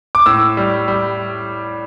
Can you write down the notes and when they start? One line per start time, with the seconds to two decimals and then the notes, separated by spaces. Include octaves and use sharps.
0.15 D6
0.26 A2 E6
0.57 G3
0.88 G3